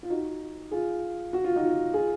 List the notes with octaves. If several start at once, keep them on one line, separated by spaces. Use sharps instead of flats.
F4
D#4 F#4
F4 G#4
F#4
F4
D#4 F#4
F4 G#4